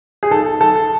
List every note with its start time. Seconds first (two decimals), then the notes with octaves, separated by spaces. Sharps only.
0.23 G#4
0.31 B1 A4
0.60 B1 A4